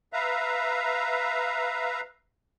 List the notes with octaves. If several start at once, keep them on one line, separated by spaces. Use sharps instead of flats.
B4 E5 F5 A#5